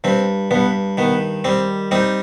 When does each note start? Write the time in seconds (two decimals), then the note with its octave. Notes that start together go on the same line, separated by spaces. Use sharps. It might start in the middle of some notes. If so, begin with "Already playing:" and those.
0.04 G2 C4
0.51 G2 B3
0.98 D#3 B3
1.44 G3 C4
1.91 G3 C4 D#4